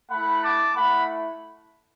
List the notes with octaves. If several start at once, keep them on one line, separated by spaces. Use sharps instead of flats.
A3 E4 F#5 B5
A5 D6
A3 E4 F#5 B5